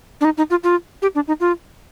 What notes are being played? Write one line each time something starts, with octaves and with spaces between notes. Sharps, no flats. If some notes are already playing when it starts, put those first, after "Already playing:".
D4
D#4
D#4
F4
F4
G4
D4
D#4
F4